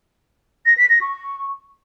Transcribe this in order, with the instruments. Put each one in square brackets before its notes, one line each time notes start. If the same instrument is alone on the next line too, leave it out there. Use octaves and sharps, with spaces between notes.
[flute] A#6
B6
A#6
C#6